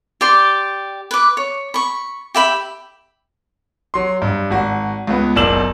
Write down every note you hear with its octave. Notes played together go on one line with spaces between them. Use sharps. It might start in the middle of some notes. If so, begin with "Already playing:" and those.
G4 D5 C6
B4 D6
C#5
B5 C#6
G4 E5 B5
F#3 C6
G2
G#1 F#4
C#2 B3
F#1 B1 D5 E6 E7 F#7